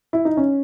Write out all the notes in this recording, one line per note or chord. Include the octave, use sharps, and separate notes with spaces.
E4
D#4
C#4